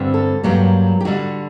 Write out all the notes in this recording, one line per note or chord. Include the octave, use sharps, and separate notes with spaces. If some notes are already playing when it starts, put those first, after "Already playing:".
Already playing: G2 D3 G3 C4
A4
G2 F#3 A#3 G4
G4
D3 G3 D4 F#4